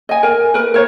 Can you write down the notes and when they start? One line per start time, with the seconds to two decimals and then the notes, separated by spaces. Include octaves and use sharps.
0.09 D#5 G#5
0.23 A#4 G#5
0.54 A#4 B4
0.74 A#4 C5 C#5